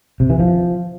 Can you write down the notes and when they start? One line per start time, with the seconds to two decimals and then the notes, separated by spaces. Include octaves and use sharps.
0.20 C3
0.30 E3
0.39 F3